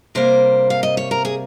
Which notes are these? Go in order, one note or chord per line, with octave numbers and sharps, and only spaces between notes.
C3 G3 A#3 C5
F5
D#5
C#5
A#4
G#4